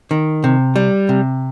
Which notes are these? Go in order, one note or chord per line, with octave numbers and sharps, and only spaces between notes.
D#3
C3
G3
C3